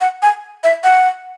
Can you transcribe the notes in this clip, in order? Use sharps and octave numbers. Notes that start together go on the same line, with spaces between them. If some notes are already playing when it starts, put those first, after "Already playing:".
F#5
G#5
E5
F#5